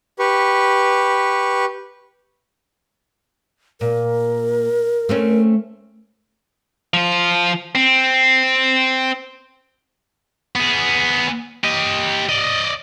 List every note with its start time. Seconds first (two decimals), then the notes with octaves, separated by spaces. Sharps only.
0.19 G4 B4 C#6
3.81 A#2 A#4
5.09 A3 C4 C#4
6.94 F3 F4
7.75 C4
10.55 B3 G#4
11.63 G4 D#5
12.29 D5 D#5